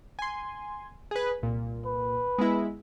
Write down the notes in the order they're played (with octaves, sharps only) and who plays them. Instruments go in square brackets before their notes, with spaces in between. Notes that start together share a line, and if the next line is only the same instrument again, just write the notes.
[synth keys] G#5 C6
G#4 B4
C2 A#2
[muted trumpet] B4
[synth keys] G#3 B3 E4